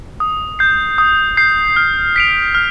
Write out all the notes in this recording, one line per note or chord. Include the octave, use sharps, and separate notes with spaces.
D#6
G6 C7
D#6
G6 C7
F6
B6 D7 F7
F6